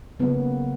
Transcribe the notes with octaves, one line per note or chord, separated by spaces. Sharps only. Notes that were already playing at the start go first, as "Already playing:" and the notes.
C#3 F#3 A#3 B3